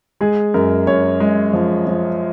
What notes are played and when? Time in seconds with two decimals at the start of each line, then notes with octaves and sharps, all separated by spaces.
0.21 G#3 G#4
0.54 F#2 A#4
0.87 F#2 C#5
1.20 G#3
1.54 F3
1.87 F3